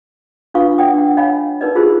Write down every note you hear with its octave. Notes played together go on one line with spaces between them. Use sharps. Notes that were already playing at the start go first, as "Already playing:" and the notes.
D4 F4 B4 F5 C#6 D#6
D5 F#5 G5 D#6
D4 F#5
C#5 D#5 F5 F#5 G#5 B5
D#4 A#4 B4 D5 D#5
E4 F4 G4 G#4 A#4 C5